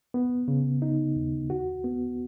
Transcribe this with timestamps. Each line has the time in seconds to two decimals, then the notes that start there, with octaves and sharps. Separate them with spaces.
0.14 B3
0.48 C#3
0.82 D#4
1.16 D#2
1.50 F#4
1.84 B3